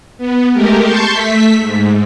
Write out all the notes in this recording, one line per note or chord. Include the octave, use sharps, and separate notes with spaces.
B3
G#3 A3 G4 A#4
A5 C6 C#6 G6
A3 E5 B6
G#2